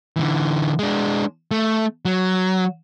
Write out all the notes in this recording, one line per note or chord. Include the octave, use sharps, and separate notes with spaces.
D3 E3
G#3 D4
A3
F#3